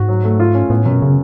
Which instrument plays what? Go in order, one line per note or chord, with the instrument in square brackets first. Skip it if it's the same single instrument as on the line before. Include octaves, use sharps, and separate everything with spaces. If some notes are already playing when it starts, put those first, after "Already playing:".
Already playing: [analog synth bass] G#2 [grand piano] F#4
[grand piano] F#3
A3
F4
C#4
[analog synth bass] A2 [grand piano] B3
[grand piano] F#2 [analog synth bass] B2
[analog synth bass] C#3